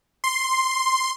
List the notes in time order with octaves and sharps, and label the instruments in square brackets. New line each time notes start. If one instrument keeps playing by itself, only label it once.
[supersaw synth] C6